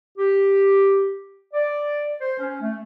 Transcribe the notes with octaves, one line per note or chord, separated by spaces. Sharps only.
G4
D5
C5
C#4
A3